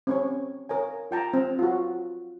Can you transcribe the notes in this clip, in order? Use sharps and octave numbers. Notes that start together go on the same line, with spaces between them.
C4 C#4 C#5
A#4 C#5 G#5
F4 G5 A5 A#5
C4
F4 F#4